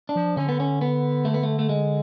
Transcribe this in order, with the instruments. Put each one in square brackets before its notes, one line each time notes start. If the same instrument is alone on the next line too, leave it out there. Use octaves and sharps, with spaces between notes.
[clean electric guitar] D4
[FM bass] F3
[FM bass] D3 [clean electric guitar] C#4
[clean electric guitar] B3
C#4
B3
A3
B3
A3
A3
G#3